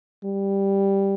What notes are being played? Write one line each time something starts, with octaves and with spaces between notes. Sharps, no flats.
G3